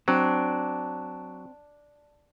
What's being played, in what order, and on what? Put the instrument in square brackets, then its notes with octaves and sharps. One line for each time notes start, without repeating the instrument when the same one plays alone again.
[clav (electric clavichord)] F#3 [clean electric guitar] C4 [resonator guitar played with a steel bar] D4